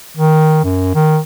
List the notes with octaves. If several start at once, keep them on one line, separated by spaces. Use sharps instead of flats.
D#3
F#2
D#3